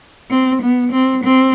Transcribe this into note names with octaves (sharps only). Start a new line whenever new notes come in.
C4
B3
C4
C4